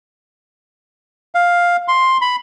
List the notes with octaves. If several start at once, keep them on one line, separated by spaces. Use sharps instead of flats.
F5
C6
B5